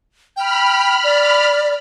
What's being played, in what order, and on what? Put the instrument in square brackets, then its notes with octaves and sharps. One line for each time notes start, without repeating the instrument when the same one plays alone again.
[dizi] G5 [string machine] B5 F6
[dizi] D5